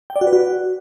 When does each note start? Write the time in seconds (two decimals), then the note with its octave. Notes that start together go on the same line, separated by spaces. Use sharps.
0.10 G5
0.16 D5
0.21 F#4
0.27 B4
0.33 F#4